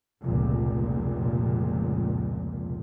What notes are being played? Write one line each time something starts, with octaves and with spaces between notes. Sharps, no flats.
F1 C#2 A#2